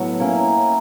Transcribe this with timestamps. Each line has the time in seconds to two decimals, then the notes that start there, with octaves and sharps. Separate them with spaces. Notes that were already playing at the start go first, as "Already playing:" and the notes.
Already playing: A2 F#3 B3
0.20 A#3 C#4 E4